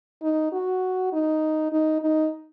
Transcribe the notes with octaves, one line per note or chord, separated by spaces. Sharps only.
D#4
F#4
D#4
D#4
D#4